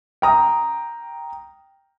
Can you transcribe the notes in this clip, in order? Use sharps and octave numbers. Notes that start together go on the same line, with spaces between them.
G5 A#5 D#6